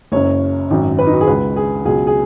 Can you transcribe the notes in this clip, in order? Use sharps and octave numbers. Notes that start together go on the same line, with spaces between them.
F#1 F#2 C#3 C#5
G#1 F#2 F#3
B4
D#4
F#4
G#4
C#2 C#3 G#3 B4
G#4
C#2 B2 F#3 G#4
G#4